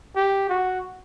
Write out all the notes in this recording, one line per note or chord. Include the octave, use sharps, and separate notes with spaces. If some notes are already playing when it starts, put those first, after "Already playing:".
G4
F#4